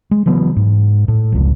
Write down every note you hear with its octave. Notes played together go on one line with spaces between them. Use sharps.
G#3
C#3 E3 F#3 B3
G#2
A2
F1 C#2